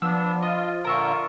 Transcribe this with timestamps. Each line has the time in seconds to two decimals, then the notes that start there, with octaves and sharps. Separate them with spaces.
0.02 F3 B3 D4 E6
0.42 F4 D#5
0.85 A#2 D3 F4 A#4 E5 C#6